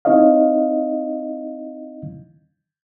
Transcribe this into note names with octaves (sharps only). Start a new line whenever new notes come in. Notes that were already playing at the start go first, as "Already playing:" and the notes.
C4 D#4 E4 C#5 D#5 F5